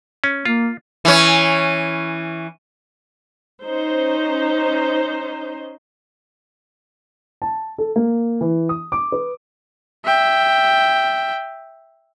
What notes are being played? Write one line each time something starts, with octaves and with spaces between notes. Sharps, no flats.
C#4
A#3 F4
E3 C#4
C#4 D#4 C5
A5
A4
A#3
E3
D#6
D6
B4
E5 G5